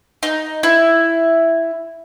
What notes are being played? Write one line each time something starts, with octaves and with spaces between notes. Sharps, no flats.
D#4
E4